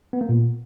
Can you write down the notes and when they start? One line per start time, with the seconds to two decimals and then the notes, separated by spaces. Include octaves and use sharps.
0.13 B3
0.21 A#3
0.29 A#2